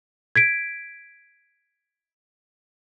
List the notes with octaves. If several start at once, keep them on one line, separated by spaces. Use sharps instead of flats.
G#6 B6 D7